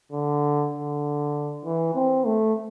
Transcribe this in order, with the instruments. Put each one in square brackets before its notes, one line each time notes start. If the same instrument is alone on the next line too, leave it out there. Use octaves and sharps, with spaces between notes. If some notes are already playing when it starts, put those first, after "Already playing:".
[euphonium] D3
D3
E3
C4
A3